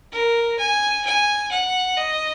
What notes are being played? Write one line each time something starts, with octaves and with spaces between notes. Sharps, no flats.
A#4
G#5
G#5
F#5
D#5